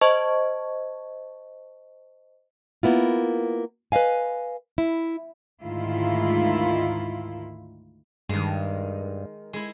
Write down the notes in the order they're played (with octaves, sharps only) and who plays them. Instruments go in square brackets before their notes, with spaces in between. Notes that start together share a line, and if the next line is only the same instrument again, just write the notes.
[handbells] C5 D#5 A5 C#6 G#6
[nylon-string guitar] A#3 B3 E4 F4
B4 C5 D#5 F5 G#5
E4
[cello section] D2 G#2 D#3 E4 F4
[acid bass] G2 [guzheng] D#3 G#3
[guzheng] G#3 E4